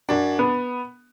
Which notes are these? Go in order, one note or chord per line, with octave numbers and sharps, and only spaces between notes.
F#2 D4
B3